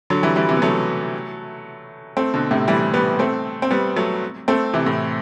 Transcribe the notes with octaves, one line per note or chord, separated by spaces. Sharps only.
D3 F#3
E3 G3
E3 G3
C3 E3
B3
F#3 A3
A3 C4
B2 D3
A2 C3
E3 G3
G3 B3
A3 C4
C4
G3 B3
F#3 A3
A3 C4
C3 E3
A2